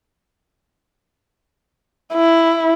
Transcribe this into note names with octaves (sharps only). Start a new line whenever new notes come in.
E4